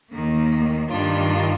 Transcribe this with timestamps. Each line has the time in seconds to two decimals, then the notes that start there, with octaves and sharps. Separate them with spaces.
0.11 D#2 D#3 A#3
0.89 G2 D#3 G3 D4 F4